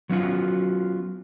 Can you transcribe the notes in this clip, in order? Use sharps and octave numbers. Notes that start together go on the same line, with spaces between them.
F#3 B3 C#4 F4 F#4